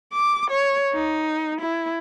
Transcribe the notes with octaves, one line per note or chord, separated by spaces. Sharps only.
D6
C#5
D#4
E4